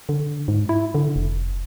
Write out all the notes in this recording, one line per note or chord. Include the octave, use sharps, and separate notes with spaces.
D3
G#2
E4
D3
F1